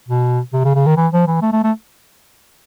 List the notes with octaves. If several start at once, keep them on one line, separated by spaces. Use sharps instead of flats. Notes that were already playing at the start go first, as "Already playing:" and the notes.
B2
C3
C#3
C#3
D#3
E3
F3
E3
A3
A3
A3